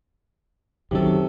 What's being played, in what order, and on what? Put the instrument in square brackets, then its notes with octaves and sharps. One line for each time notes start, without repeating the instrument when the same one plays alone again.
[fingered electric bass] F#2 D#3 F#3 [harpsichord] C3 A4